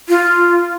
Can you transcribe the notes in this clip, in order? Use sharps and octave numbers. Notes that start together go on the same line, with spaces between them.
F4